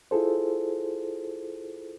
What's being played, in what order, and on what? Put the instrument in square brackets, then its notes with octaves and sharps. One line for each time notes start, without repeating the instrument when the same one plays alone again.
[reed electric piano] E4 F4 G#4 A4 C5